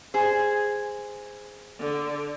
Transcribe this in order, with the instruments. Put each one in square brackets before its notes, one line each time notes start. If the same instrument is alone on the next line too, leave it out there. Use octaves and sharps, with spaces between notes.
[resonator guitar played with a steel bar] G#4 C5
[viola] D3